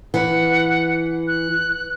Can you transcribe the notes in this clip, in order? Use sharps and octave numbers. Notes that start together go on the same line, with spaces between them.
E3 F#5
F#6